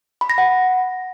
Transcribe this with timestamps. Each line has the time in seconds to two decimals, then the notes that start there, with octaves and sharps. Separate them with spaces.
0.21 B5
0.30 A#6
0.38 F#5